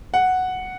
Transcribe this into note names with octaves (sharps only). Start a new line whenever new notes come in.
F#5